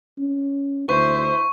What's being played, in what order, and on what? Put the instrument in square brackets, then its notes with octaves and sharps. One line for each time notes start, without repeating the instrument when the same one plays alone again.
[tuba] C#4
[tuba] D2 [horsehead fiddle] E4 C5 [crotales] C#6